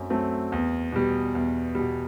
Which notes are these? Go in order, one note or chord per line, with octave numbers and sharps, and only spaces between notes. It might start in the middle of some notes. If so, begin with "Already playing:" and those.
Already playing: F#2 F#3 A3 C4
F#3 A3 C4
E2
B2 G3
E2
B2 G3